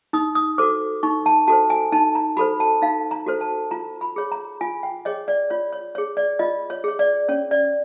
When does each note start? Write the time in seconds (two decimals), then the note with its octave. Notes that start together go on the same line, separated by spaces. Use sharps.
0.13 D#4 D#6
0.35 D#6
0.58 F#4 A4 C5 D6
1.03 D#4 C#6
1.26 A5
1.48 F#4 A4 C5 A5
1.70 G#5
1.92 D#4 A5
2.15 A#5
2.37 F#4 A4 C5 B5
2.60 A5
2.82 D#4 F5
3.11 A#5
3.26 F#4 A4 C5
3.41 A5
3.71 F4 A#5
4.01 B5
4.16 G#4 C#5
4.32 A#5
4.61 F4 G#5
4.83 G5
5.05 G#4 C#5 D#5
5.28 D5
5.50 F4 C#5
5.73 C#5
5.95 C#5
5.98 G#4
6.17 D5
6.39 F4 D#5
6.70 C#5
6.84 G#4 C#5
6.99 D5
7.29 C#4 C#5
7.51 D5